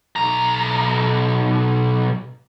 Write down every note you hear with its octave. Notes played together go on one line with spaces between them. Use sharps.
B1 A#5